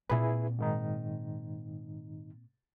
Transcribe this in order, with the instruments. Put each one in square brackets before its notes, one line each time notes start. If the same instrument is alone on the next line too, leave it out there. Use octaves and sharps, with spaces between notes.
[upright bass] A#2 C4 [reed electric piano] E4 G#4 B4
[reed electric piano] G#2 D#3 D#4